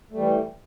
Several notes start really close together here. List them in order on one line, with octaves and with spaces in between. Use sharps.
A3 G3 E3